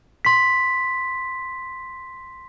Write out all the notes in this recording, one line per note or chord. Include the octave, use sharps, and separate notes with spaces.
C6 B6